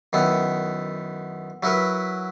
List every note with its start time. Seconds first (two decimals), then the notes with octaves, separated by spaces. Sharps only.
0.13 F#2 D#3 B3 E4
1.63 F#3 E4 F#4 A#4 B4